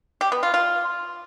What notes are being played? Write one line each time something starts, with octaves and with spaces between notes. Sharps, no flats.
G4
B3
F4
F4